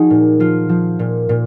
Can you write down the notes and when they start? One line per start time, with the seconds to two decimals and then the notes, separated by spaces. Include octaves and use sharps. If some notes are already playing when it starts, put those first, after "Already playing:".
Already playing: F3 D#4 F#4 G#4
0.11 A#2
0.40 F3 F4
0.69 F3
0.99 A#2
1.29 A#2